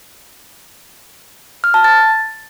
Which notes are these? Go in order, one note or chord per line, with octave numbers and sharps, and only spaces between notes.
F6
A5
A6